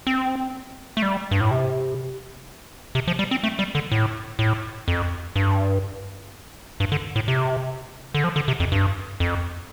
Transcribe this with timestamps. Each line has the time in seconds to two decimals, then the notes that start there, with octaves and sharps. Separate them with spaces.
0.07 C4
0.97 A3
1.02 G3
1.31 G2
1.41 A2
1.51 C3
2.95 C3
3.08 F3
3.19 G3
3.31 C4
3.43 A3
3.59 G3
3.75 D3
3.92 A2
4.39 A2
4.88 F2
5.36 G2
6.80 G2
6.92 D3
7.16 A2
7.28 C3
8.14 D3
8.24 F3
8.36 D3
8.48 C3
8.60 F2
8.72 G2
9.20 F2